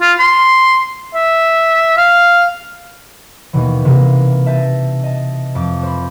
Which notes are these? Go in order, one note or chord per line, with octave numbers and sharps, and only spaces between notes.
F4
C6
E5
F5
D#2 B2 E3
C3 E3 A#3
E5 A5 G6 A6 A#6 D#7
D#5 A5
F2 D6
C5 B5